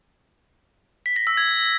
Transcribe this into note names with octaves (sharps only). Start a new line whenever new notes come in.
B6
A#6
E6
G#6